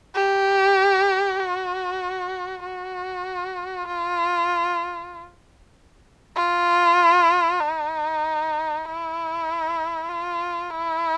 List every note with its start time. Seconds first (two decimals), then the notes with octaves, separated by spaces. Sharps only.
0.15 G4
1.40 F#4
2.64 F#4
3.88 F4
6.36 F4
7.61 D#4
8.85 E4
10.09 F4
10.71 E4